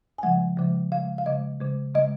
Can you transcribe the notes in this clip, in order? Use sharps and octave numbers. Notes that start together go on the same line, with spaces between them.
G#5
C#3 F3 G#3 F#5
C#3 F3 G#3
C#3 G#3 F5
F5
C#3 G#3 D#5
C#3 G#3
C#3 G#3 D#5